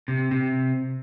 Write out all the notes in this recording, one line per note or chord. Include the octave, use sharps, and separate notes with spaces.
C3
C3